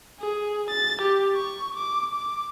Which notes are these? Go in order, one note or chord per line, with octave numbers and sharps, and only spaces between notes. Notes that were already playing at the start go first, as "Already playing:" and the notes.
G#4
A6
G4
C#6
D6
D6